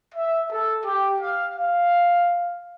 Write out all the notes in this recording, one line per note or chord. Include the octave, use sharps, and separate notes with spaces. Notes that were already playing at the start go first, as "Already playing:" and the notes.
E5
A4
G4
F5
F5